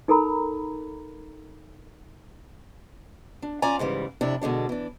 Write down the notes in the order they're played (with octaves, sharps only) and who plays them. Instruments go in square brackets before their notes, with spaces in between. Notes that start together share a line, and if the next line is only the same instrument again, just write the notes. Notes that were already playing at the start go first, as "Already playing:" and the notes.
[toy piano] D#4 A4 A#4 A#5 B5
[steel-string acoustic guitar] D4
C#4 F4 D5 G#5 A#5
G#2 C#3 E3 G3
F2 C3 D4 E4
B2 D3 G#3 D4
E3 D4